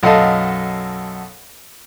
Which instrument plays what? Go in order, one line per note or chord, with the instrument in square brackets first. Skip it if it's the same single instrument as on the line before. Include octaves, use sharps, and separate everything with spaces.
[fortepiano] B1 F#2 A4 D#5 F5 A5